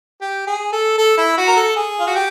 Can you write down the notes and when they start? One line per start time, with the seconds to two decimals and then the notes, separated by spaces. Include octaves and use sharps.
0.21 G4
0.47 G#4
0.73 A4
0.98 A4
1.18 E4
1.38 F#4
1.47 A#4
1.56 A4
1.76 G#4
2.00 F4
2.07 F#4
2.15 G4